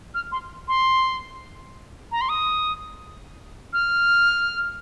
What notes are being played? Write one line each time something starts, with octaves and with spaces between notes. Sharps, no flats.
F6
C6
C6
A#5
C6
D#6
F6